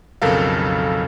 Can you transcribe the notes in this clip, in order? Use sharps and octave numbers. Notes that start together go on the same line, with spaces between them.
B1 F2 C#3 A4 A#4 F5